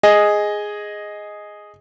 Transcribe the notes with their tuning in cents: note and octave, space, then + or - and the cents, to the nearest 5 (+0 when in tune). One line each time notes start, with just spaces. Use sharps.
G#4 +0 D#5 +0